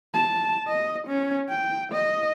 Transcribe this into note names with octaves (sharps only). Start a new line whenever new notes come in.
A5
D#5
C#4
G5
D#5